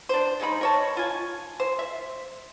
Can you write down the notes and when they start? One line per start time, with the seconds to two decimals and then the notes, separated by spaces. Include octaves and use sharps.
0.09 D4 C5
0.40 D#3 G#3 D#4 B5
0.61 A#4 C#5 A5
0.97 F4 G#5
1.60 C5
1.79 E5